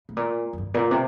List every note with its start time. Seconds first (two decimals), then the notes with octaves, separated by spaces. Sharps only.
0.09 A2
0.17 A#2
0.53 F2
0.58 G2
0.74 A#2
0.91 C3